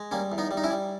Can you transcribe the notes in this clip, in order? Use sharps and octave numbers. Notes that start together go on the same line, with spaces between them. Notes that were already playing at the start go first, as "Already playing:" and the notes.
Already playing: G#3
G3 A#3 C#4
E2
B3 D#4
G3
D#4
C#4 E4
G3